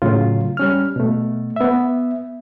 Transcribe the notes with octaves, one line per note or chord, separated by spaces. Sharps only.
A2 C#3 F#3 F4
G3 C#4 F6
B2 A3
B3 E5